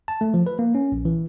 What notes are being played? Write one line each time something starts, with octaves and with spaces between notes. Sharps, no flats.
A5
A3
F3
B4
A#3
C#4
A#1
E3